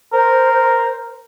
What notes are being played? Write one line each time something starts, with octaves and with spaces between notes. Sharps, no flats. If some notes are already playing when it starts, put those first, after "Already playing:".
A#4 C5